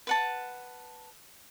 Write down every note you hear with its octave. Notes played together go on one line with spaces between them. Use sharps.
B4 F#5 A5